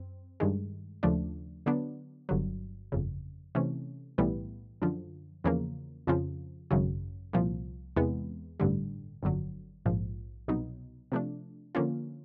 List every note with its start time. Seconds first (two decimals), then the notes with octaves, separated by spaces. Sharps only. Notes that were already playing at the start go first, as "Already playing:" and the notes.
Already playing: F#2 C4
0.40 G2 D#3 G#3
1.03 D#2 C#3 F3 A3 D4
1.66 D3 F#3 B3 D4
2.29 G1 G2 D3 F#3
2.92 G1 F2 C#3
3.55 C3 E3 A3 C#4
4.18 B1 A2 E3 G3 B3
4.82 F#2 D3 F3
5.44 E2 C#3 F3 A#3
6.07 F2 C#3 F3
6.71 G#1 F#2 C#3 F#3
7.33 C2 A#2 F3
7.96 E2 C3 E3 G#3 B3
8.60 A1 G2 D3 G3
9.23 G1 F2 D3 F#3
9.86 A#1 G#2 F3
10.48 C2 B2 F#3 B3 D#4
11.12 C3 F3 A3 D4
11.75 D3 F3 A#3 C#4 F4